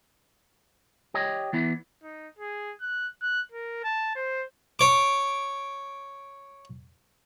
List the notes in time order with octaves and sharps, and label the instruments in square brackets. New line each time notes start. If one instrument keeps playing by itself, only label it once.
[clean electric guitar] G4 C#5 D#5
E3 B3 E4
[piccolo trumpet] D#4
G#4
F#6
F#6
A#4
A5
C5
[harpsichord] C#5 D6